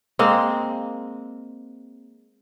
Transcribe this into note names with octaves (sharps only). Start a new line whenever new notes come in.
G#3 A#3 C4